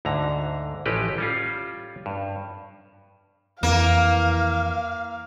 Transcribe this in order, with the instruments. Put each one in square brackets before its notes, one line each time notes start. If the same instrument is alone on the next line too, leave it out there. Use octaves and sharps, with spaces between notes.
[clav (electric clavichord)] D2 G#2 D3 A#5
A1 E3 F3 G4 B4 D#5
G3 C#4 F4
G2
[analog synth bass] F2 [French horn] E3 [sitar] A#3 [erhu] F5